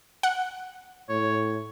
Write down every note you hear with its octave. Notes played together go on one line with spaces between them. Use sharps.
F#5
A2 C#5